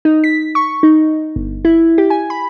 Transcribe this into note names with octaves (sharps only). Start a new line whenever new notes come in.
D#4
B6
C#6
D#4
G1
E4
G4
G#5
B5